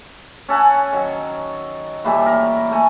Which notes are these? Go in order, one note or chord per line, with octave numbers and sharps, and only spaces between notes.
C#4 A4 F#5 G#5
D#3 F#3
A#2 E3 G3 A3
A#4
A3 G#5